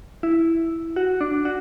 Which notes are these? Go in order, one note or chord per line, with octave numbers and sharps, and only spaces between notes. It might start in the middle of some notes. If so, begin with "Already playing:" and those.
E4
F#4
D4
F#4